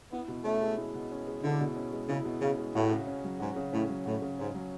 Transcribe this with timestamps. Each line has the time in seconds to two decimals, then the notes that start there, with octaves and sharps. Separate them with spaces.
0.12 B3 E4
0.28 B2
0.45 A3 C#4
0.62 G#3
0.78 E4
0.94 B2
1.11 C#4
1.27 G#3
1.44 D3 E4
1.60 B2
1.76 C#4
1.92 G#3
2.08 C#3 E4
2.25 B2
2.41 C#3 C#4
2.58 G#3
2.75 A2 F#4
2.91 C#3
3.07 C#4
3.24 F#3
3.40 G#2 F#4
3.56 C#3
3.73 A2 C#4
3.89 F#3
4.06 A2 F#4
4.22 C#3
4.39 G#2 C#4
4.55 F#3